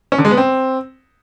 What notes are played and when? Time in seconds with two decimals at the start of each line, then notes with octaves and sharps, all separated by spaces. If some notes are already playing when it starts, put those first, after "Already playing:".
0.12 C#4
0.18 D3
0.25 G#3
0.31 B3
0.37 C4